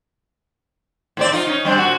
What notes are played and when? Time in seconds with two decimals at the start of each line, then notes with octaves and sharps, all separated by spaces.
1.17 A2 C4 D5
1.32 D#4 F4
1.47 C#4 D#4
1.65 G3 C4 D4
1.78 A#2 F#4